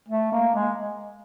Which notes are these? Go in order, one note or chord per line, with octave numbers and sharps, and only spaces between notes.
A3
A#3
G#3